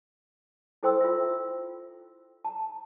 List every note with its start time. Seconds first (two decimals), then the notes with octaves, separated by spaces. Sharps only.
0.83 E4 A4 C5 G5 C6 E6
1.01 F4 E5
2.45 A5 A#5